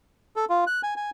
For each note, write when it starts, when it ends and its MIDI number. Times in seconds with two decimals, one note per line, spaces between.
0.36 0.45 69
0.50 0.64 65
0.67 0.81 90
0.83 0.94 80
0.97 1.10 80